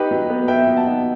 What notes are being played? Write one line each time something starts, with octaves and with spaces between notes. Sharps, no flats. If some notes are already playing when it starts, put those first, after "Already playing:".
Already playing: D#4 G4 B4
F#3
B3
B3 E5 G5
F#3
F#5 A5
D#4